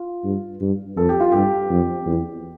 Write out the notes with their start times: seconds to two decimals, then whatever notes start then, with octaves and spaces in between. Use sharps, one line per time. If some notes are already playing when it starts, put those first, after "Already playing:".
Already playing: F4
0.24 G2
0.61 G2
0.97 F2 A4
1.09 G4
1.20 F4
1.32 G2 G4
1.70 F2
2.06 E2